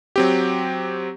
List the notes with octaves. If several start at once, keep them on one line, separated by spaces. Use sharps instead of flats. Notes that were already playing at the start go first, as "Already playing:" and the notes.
F#3 C4 G4